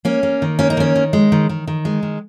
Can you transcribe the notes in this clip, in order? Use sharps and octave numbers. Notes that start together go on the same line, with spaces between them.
A#3 C#4
A#3
D#3
A#3 C#4
D#4
D#3 C#4
D#3
G#3
D#3
D#3
D#3
G#3
D#3